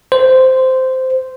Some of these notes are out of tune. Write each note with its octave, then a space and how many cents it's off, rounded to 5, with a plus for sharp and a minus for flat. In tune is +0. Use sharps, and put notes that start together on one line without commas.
C5 -10